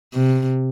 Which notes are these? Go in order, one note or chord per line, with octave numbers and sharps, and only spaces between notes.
C3